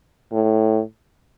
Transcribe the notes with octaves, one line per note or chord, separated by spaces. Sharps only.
A2